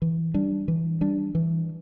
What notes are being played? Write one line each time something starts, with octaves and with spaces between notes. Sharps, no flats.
E3
G3 D4
E3
G3 D4
E3